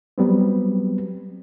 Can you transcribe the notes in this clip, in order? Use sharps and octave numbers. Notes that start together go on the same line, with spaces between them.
F#3 G3 B3 C4